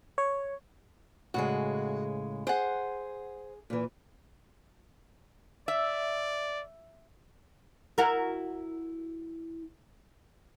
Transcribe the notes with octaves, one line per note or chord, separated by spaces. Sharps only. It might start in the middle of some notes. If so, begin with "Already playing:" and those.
C#5
A2 C#3 G#3 F#4
G#4 C5 F#5
A#2 E3
D5 E5
E4 F#4 A#4